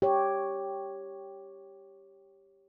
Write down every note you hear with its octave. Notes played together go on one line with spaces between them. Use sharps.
G4 C#5